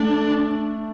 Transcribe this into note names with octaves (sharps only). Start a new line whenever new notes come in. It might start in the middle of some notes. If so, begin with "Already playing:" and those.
Already playing: A3 D4